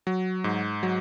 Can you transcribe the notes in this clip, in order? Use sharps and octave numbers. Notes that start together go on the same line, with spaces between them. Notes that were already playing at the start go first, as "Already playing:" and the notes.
F#3
G#2
F#3